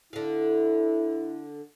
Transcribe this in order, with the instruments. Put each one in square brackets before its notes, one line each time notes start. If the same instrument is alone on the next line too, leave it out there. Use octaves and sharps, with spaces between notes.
[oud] D3 F5 [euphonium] E4